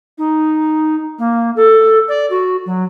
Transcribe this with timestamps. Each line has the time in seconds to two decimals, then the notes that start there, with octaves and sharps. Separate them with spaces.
0.18 D#4
1.19 A#3
1.56 A4
2.08 D5
2.30 F#4
2.66 F#3